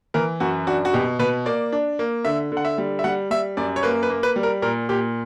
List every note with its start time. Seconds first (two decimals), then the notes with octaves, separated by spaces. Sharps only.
0.14 E3 A#4
0.40 F#2 F#4
0.67 D4 F#4
0.85 F#4
0.93 B2 G4
1.19 B2 B4
1.46 A#3 D5
1.72 D4
1.99 A#3
2.25 D3 E5
2.52 D3
2.57 F#5
2.65 E5
2.78 G3
2.99 E5
3.04 G3 F#5
3.31 G3 E5
3.57 F#2 D5
3.76 C#5
3.83 A#3 B4
4.03 B4
4.10 A#3
4.23 B4
4.36 G3
4.43 A#4
4.62 A#2 A#4
4.89 A#2 G4